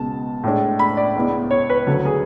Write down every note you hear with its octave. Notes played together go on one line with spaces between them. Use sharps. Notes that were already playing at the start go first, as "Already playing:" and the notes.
Already playing: C#2 B2 G#3 A5
A2 G#3 D4
B5
D5
C#2 C#3 G#3 B3 E4
C#5
B4
D2 D3 F#3 A4
G#4